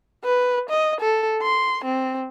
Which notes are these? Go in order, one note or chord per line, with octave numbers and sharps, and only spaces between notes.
B4
D#5
A4
C6
C4